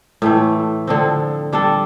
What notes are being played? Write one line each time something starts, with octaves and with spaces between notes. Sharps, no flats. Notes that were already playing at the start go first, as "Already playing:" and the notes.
A2 E3 A3
D3 F3 C4
G3 D4 A4